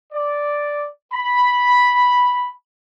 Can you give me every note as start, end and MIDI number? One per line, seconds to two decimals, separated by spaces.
0.13 0.88 74
1.13 2.50 83